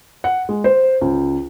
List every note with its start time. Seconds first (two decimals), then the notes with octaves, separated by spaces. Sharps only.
0.24 F#5
0.49 G#3
0.64 C5
1.01 C#2